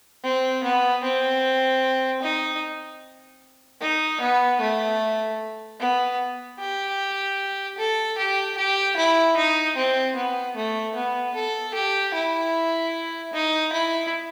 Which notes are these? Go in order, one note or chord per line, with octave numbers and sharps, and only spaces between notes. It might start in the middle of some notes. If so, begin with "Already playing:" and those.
C4
B3
C4
D#4
D#4
B3
A3
B3
G4
A4
G4
G4
E4
D#4
C4
B3
A3
B3
A4
G4
E4
D#4
E4